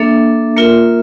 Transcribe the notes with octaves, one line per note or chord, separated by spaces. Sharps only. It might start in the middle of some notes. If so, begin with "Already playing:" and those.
Already playing: A#3 D4 A4 E5
A#3 F4 A#4 E5